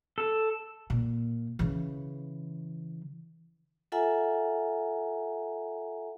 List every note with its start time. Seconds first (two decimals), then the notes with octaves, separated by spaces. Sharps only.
0.18 A4
0.90 A#2
1.59 C#3 E3
3.92 F4 A4 E5 F#5 G#5 A#5